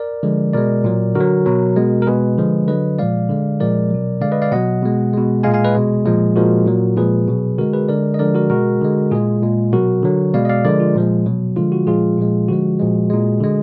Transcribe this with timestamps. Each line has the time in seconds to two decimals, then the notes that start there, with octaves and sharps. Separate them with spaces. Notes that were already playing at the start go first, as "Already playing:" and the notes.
Already playing: A#4 D5
0.23 D3 F3 G#3
0.53 B2 G#3 A#4 D5
0.84 A#2 F#3
1.15 D3 F#3 F#4 A#4
1.46 B2 F#3
1.76 B2 G#3
2.02 A#4
2.07 B2 G#3 G#4 B4
2.38 D3 F3 G#3
2.68 D3 F#3 B4 D#5
2.99 A#2 F3 G#3 D5 F5
3.29 D3 G#3
3.60 A#2 F3 G#3 A#4 D5
3.91 B2 F#3
4.21 D3 G#3 D5 F5
4.32 B4 D#5
4.42 D5 F5
4.52 B2 F#3 D#5 F#5
4.82 B2 G#3
5.13 B2 G#3
5.43 A#2 G#3 F5 G#5
5.54 F5 G#5
5.65 B4 D#5
5.75 B2 G#3
6.06 A#2 F3 G#3
6.36 A#2 F3 G#3 F#4 A#4
6.66 A#2 F#3
6.97 A#2 F3 G#3 G#4 B4
7.28 B2 F#3
7.58 D3 G#3 F#4 A#4
7.73 G#4 B4
7.89 D3 G#3 A#4 D5
8.14 D#5
8.19 D3 F3 G#3 A#4 D5
8.35 F#4 A#4
8.50 B2 G#3 F#4 A#4
8.81 D3 G#3
9.11 A#2 G#3 F4 G#4
9.42 A#2 G#3
9.72 B2 F#3 F#4 A#4
10.03 D3 F#3
10.34 B2 G#3 D5 F5
10.45 D#5
10.50 D5 F5
10.65 D3 F3 G#3 A#4 D5
10.80 F4
10.95 A#2 F3 G#3
11.26 B2 F#3
11.56 D3 F3 G#3 F4
11.72 F#4
11.87 A#2 F3 G#3 F4 G#4
12.18 A#2 F3 G#3
12.48 D3 F3 G#3 F#4
12.79 A#2 F3 G#3
13.10 A#2 G#3
13.40 D3 G#3